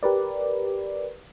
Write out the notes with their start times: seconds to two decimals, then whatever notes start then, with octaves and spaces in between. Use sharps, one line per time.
0.03 G4 A#4 B4 D5